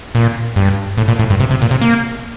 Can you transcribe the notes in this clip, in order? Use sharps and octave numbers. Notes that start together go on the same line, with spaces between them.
A#2
G2
A2
A#2
A2
G2
C3
C3
A#2
C3
A#3